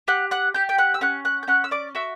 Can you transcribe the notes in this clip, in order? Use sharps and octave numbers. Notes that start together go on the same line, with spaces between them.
G4 F#5 F#6
F#5 F#6
G4 G6
G5 G6
F#5 F#6
E6
C#4 F#5 F#6
F#5 F#6
G6
C#4 F#5 F#6
E6
D5 D6
F#4 E5 E6